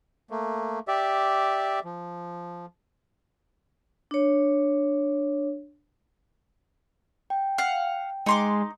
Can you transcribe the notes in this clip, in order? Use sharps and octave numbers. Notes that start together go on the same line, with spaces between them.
A3 A#3
G4 D5 E5
F3
D4 C#5
G5
F5 F#5
G#3 D#4 C6 D6